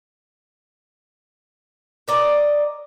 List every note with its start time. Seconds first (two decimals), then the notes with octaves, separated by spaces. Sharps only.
2.08 A#4 D5 D#5